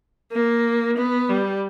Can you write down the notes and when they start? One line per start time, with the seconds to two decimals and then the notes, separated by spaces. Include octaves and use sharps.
0.32 A#3
0.96 B3
1.29 G3